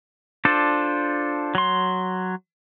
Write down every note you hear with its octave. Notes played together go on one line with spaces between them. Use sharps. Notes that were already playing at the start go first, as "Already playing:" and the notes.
D4 F4 A4 C5 D5
F#3 C6